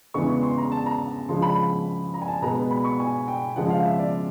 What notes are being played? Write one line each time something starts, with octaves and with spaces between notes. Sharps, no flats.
E2 C#3 E3 G#3 B3 C#6
C#6
C6
A#5
A5
A#5
C#3 F3 G#3 C6
B5
A#5
G#5
A5
B2 G#3 B3 A#5
B5
C#6
G#5
G5
C#3 F3 G#3 F#5
F5
E5
D5